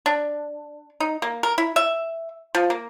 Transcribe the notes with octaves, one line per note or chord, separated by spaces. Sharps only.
D4
D#4
A#3
A#4
E4
E5
F3
A#3